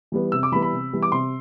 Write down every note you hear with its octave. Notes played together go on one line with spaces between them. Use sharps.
E3 G3 B3
C3 E6
D6
E3 G3 B3 B5
B5
C3
E3 G3 B3
D6
C3 C6